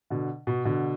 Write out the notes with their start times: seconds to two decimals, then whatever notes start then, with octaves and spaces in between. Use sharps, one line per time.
0.10 B2 D3
0.47 B2
0.65 B2 D3